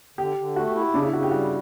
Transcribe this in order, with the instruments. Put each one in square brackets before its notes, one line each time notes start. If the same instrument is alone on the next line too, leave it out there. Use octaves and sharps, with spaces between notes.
[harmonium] D3 [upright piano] G4
[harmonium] D3
[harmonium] A3 [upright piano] F#4
[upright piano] G4
[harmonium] E4
[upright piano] F#4
[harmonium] C#3 [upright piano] D4
[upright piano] E4
[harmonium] C#3 [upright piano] F#4
[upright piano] G4
[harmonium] G3 [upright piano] F#4